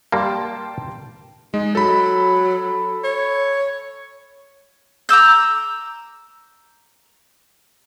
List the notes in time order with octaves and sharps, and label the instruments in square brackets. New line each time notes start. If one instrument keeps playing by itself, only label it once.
[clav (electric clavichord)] G3 A#3 [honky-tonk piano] G5 A5 C6
[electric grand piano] G#3 [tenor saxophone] D#4
[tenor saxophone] F#3 [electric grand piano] A4 B5
[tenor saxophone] C#5
[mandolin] A#5 D6 E6 G6